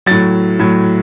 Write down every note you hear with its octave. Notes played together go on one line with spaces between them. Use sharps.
A2 F#3 A6
A2 F#3